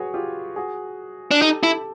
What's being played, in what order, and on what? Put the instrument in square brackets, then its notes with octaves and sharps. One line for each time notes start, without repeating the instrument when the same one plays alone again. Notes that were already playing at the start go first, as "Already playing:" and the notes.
Already playing: [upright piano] F#4 G#4 B4 C#5
F4 G4
F#4 G#4
[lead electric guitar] D4
[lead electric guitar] D#4 [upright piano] G4 A4
[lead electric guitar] E4 [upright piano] G4 A4